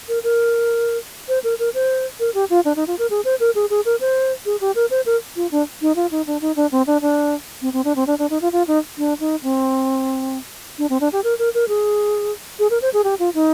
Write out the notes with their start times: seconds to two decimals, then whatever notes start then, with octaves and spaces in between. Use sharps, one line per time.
0.09 A#4
0.24 A#4
1.29 C5
1.44 A#4
1.59 A#4
1.74 C5
2.20 A#4
2.34 G4
2.50 F4
2.65 D4
2.76 D#4
2.87 F4
2.99 A#4
3.10 G#4
3.25 C5
3.40 A#4
3.55 G#4
3.70 G#4
3.85 A#4
4.00 C5
4.46 G#4
4.61 G4
4.75 A#4
4.91 C5
5.06 A#4
5.36 F4
5.51 D4
5.82 D#4
5.96 F4
6.11 D#4
6.27 D4
6.41 D#4
6.56 D4
6.72 C4
6.87 D4
7.02 D4
7.62 C4
7.73 C4
7.85 D4
7.96 C4
8.07 D4
8.19 D4
8.30 D#4
8.42 F4
8.52 F4
8.68 D#4
8.98 D4
9.20 D#4
9.43 C4
10.78 D4
10.90 C4
11.01 D4
11.13 G4
11.24 A#4
11.39 A#4
11.54 A#4
11.68 G#4
12.59 G#4
12.71 A#4
12.82 C5
12.94 G#4
13.04 G4
13.19 F4
13.35 D#4